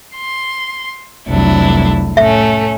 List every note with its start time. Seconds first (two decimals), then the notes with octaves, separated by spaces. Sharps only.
0.16 C6
1.27 F1 C2 F#3 D4 E4
2.17 A2 A3 C#4 E5